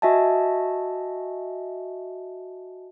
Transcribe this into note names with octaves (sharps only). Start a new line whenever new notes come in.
F#4 D#5 E5 G#5 A5